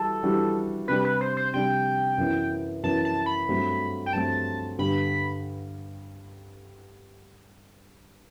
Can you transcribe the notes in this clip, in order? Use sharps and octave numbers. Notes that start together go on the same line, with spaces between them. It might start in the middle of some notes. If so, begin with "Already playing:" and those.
Already playing: E3 G3 F#4 A4
E3 G3 D4 F#4
C3 G3 D4 G4 B4
B4
C5
C5
C3 G3 D4 G4 G5
F#2 E3 B3
F#2 E3 B3 A5
A5
B5
G2 F#3 A3 C4
G5
G2 F#3 A3 C4 A5
G2 D3 G3 B3 B5